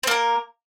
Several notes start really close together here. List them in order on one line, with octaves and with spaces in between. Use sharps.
C4 A#3 A#4